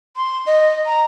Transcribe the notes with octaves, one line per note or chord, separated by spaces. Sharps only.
C6
D#5
A#5